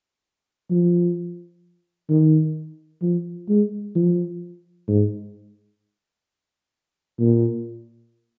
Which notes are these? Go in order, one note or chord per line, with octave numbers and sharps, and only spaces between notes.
F3
D#3
F3
G#3
F3
G#2
A#2